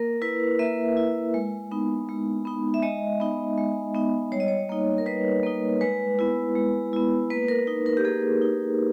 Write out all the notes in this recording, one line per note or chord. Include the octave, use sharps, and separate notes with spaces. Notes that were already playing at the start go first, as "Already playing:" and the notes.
Already playing: A#3 A#4
E4 B4
A#3 E5
E4
G#3
B3 D#4
G#3
B3 D#4
E5
G#3 D#5
B3 D#4
G#3
B3 D#4
G3 C#5
D#5
C#5
A#3 D#4
A#4
G3 B4
A#3 D#4
G#3 B4
B3 E4
G#3
B3 E4
A#3 B4
A#4
D#4
A#4
G4
A#3 G#4
D#4